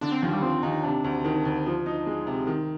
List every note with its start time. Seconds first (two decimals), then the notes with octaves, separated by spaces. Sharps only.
0.01 D3 D4
0.12 C4
0.22 D#2 F3
0.33 G3
0.42 F3 C4
0.63 D#2 D#4
0.83 C3 D4
1.04 D2
1.24 D#3
1.45 D2
1.66 F3
1.86 D#4
2.06 G#3
2.27 C3
2.47 D#3 C4